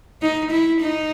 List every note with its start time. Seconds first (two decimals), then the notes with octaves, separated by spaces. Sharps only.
0.22 D#4
0.52 E4
0.81 D#4